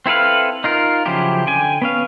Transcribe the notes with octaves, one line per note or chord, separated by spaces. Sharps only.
C4 E4 A4 B4 F5
D#4 F4 A#4
C#3 F3 F#3 E4 G4
D3 G5 G#5
B3 C#4 F5